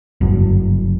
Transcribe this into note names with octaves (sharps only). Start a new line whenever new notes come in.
G1 F#2